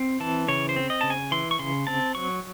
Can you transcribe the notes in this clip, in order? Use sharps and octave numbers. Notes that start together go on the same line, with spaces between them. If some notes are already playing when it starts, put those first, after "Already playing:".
Already playing: C4
E3 A5
C#3 C#5
C5
C4
D#5
C#3 A5
G#5
E3 C6
C#6
C#3 C6
C4 A5
F#3 C#6